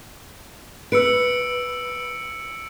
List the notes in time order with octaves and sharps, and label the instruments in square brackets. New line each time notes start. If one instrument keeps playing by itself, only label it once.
[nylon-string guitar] B4 [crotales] E6 C#7 D7